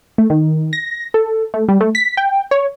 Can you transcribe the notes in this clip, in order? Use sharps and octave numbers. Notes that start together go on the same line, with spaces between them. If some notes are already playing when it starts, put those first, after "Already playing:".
A3
D#3
A#6
A4
A3
G3
A3
B6
G5
C#5